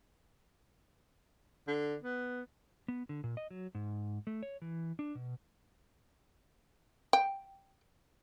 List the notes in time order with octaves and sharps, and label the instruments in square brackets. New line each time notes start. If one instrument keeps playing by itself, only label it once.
[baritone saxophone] D3
B3
[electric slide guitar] B3
D3
A#2
D#5
F#3
G#2
A3
C#5
E3
D4
B2
[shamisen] G5